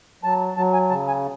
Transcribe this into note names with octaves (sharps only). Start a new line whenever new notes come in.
F#3 A5
F#3 A5
G#5
C#3 A5
G#5